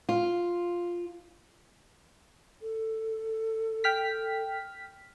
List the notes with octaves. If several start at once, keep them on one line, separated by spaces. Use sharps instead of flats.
F4
A4
G5 F6 B6